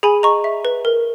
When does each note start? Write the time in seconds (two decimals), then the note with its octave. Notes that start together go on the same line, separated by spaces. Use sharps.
0.03 G#4 G#5 B5
0.23 D#5 A#5 C#6
0.44 E5
0.65 B4
0.85 A#4